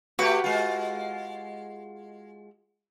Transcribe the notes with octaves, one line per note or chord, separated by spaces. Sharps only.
A3 F#4 G4 B4
G#3 F4